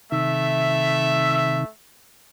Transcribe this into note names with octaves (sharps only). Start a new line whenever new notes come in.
C3 D#3 A3 E5